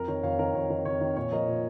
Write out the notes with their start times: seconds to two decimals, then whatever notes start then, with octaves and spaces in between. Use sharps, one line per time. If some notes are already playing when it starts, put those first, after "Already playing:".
Already playing: F2 A#4
0.08 D#3 C#5
0.23 F2 C#5 F5
0.39 D#3 A#4
0.55 F2 C#5
0.70 D#3 A#4
0.85 F2 C#5
1.01 D#3
1.17 A#2 C#5
1.32 F3 A#4 D#5
1.47 A#2